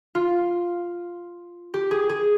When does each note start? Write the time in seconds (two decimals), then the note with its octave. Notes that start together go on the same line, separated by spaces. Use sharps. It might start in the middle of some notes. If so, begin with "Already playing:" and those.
0.15 F4
1.74 G4
1.91 G#4
2.09 G#4